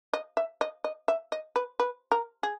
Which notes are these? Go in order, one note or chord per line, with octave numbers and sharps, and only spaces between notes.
D#5
E5
D#5
D#5
E5
D#5
B4
B4
A#4
G#4